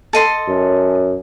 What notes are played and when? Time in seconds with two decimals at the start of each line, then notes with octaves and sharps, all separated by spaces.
0.13 A4 D#5 C6
0.49 F#2